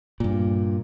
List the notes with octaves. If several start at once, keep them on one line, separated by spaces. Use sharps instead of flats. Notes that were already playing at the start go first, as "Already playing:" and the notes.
G2 A#2